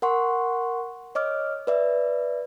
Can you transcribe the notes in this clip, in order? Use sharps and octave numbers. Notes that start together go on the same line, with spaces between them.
A#4 F#5 C6 C#6
C#5 D#5 D6 F6
B4 D5 E5